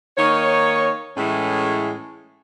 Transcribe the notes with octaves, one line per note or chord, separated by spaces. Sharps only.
D#3 A#3 D#4 C#5
A2 E3 G#3 A3 C#4 G#4